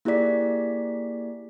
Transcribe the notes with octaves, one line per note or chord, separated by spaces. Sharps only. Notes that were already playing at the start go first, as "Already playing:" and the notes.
A#3 E4 G4 G#4 D5 B6